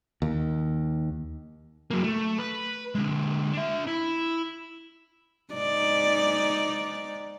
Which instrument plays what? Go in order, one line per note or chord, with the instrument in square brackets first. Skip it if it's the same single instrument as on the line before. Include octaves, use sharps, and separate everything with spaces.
[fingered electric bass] D#2
[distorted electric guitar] F#3 A#3
A3
B4
D3 G#3
D4 E5
E4
[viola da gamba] G#2 D#4 D5